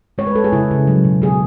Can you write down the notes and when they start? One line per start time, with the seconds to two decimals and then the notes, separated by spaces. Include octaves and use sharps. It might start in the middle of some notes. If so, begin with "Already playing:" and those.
0.18 G#3 C#5
0.27 B4
0.35 G#3 A4
0.44 G#4
0.52 C#3 E4
0.71 C#3
0.87 F#3
1.04 B2
1.22 B2 G#4